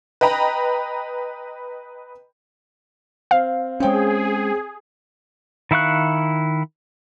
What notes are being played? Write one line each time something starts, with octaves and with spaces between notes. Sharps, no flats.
B4 D#5 G5 A#5 B5
C4 F5
G#3 C4 C#4 G#4 C#5 G5
D#3 E4 F5 C#6 F#6